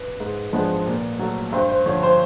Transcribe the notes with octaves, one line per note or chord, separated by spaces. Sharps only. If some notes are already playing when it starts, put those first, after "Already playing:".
Already playing: B4
G#2
F3 G#3 B3 D4
A#2
F#3 A3
G2 C5
C5
D3 F3 C#5
C5